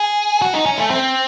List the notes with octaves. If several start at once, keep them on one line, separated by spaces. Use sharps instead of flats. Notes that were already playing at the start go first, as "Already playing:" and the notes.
Already playing: G#4
F#4
D#4
C#4
A3
C4